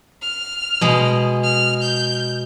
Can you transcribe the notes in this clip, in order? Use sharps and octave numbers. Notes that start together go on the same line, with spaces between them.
F6
B2 G#3
F6
G6